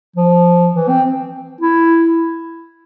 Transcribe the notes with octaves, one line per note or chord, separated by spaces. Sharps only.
F3
E3
C4
E4